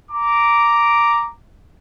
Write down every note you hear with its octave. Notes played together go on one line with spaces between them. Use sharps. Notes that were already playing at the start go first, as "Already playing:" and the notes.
A#5 D6